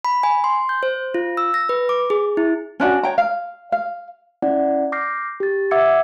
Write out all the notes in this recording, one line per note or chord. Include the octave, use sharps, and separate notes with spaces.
B5
G#5
C6
G6
C5
F4
E6
A#6
B4
D6
G#4
E4
C#4 D4 E4 F#4
C#5 G5 A#5
F5
F5
C#4 E4 D5 F#5
D6 F6 G6 A#6 C7
G4 A6
E5 F#5 D6 E6 G#6 C#7